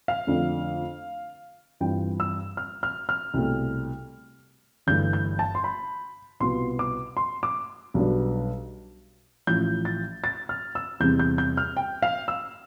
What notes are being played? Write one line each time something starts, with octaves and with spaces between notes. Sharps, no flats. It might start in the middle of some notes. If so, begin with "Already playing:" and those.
F5
F2 D3 A3 D4
G2 E3 G3 C4 F4 G5
E6
F6
F6
F6
C2 B2 A3
G1 G2 E3 A3 G6
G6
A5
C6
B5
C2 B2 B3 F4 C6
D6
C6
D6
B1 B2 G3 B3 D4
A1 A2 F3 G6
A6
A6
F6
E6
E2 C3 G3 C4 G6
G6
G6
F6
G5
F5
E6